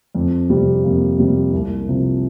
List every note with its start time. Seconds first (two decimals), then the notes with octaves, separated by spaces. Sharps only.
0.15 F2 C4
0.50 C3 G3
0.84 F2 A#3
1.18 C3 G3
1.53 C2
1.88 C3 F3